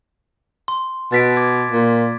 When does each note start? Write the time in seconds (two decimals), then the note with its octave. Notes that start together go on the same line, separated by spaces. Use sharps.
0.68 C6
1.12 B2 A6 B6 D7
1.37 D6 G#6
1.71 A#2